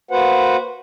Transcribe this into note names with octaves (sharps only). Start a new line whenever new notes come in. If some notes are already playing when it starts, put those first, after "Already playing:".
A#3 F#4 B4 C5 F#5